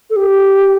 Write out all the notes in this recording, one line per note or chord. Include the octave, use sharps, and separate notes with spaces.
A4
G4